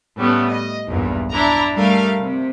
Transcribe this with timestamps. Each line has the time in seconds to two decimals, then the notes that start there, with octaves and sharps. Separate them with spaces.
0.18 A2 G3 A3 B3 C#4
0.49 D#5
0.87 B1 E2 G2 A#2
1.32 D4 E4 A#5
1.74 G3 A3 A#4 F5
2.21 C3